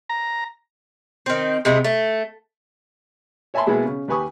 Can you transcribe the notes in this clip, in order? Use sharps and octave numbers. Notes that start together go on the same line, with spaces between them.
A#5
D#3 C4
C3 G#3 B3
A3
C#5 E5 G#5 A5 B5 C6
B2 G#3 A#3 B3 E4 G#4
C#3
D#2 G4 B4 G#5 C#6 D#6